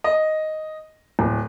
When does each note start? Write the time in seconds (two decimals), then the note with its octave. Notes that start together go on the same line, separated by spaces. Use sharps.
0.04 D#5
1.19 D1